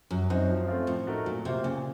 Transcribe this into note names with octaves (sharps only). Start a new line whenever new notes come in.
F#2 F#3
F#2 C4 D#4 F#4 C5
F3
A3 C4 F4
A2 F3
A3 D#4 F#4 A#4
A#2 F#3
C3 A#3 F4 C5
A#2 C#3